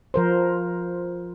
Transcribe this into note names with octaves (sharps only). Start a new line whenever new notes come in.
F3 A#4 C5